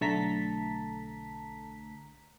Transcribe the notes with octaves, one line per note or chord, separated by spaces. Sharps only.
B1 D3 A3 A5 A#5 B6